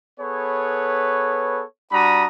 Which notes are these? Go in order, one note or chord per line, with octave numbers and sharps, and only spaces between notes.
B3 G#4 A4 B4 C#5
G3 D4 F#4 A#5 B5 D#6